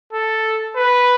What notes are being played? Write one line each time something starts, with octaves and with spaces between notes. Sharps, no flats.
A4
B4